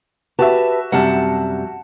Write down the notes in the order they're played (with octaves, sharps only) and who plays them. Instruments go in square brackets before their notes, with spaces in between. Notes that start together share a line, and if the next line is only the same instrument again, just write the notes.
[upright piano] F#4 E5 [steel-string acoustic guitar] G4 B4 A5
[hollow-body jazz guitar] F#2 C3 G3 [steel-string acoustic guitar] F#5 A5